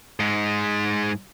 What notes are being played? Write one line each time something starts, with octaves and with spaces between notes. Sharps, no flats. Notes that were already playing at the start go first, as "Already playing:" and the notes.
G#2 G#3